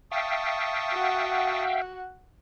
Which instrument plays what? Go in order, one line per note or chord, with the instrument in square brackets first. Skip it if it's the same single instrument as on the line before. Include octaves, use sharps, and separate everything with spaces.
[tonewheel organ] E5 F5 G5 [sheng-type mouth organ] A5 C#6 D#6
[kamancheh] F#4 F#5